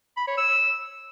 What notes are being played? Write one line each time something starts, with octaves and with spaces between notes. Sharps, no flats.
B5
C#5
E6